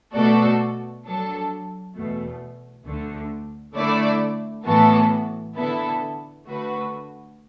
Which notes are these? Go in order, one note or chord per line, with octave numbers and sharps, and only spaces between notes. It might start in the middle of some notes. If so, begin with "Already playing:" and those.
B2 A3 F#4 A4 D5
F#3 D4 A4
E2 B2 A3
D2 D3 A3
D3 A3 E4 D5
A2 E3 B3 F#4 A4
D3 B3 E4 A4
D3 A3 F#4 B4